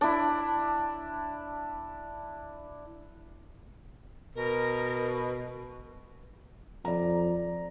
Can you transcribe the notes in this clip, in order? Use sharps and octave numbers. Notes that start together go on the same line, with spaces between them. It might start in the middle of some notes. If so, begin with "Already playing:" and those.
D4 E4
B2 A#4
F2 D5 A#5